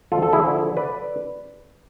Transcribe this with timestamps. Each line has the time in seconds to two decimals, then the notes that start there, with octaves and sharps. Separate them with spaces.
0.12 D2 F4 A4
0.23 A4
0.33 E4 G#4
0.44 D3 F3
0.77 B4 D5